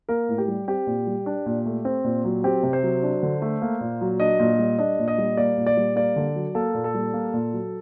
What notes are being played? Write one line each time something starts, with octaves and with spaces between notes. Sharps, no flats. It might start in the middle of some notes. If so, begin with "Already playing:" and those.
A#3 A#4
A2
G4
G3
C4 G4
A#2
G3
D4
A#2
A3
C4
A#2
F#3
C4 G4
C3
C5
F#3
D4
D3
A3
A#3
A#2
F#3
D4 D#5
A#2
G3
D4 D#5
A#2
D#5
G3
A#3 D5
A#2
D5
G3
A#3 D5
D3
F#3
A#3 A4
A#2
A4
G3
A#3
A#2
F#3